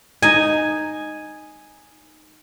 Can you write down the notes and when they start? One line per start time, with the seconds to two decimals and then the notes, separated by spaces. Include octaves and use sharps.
0.22 D#4 D#5 G#5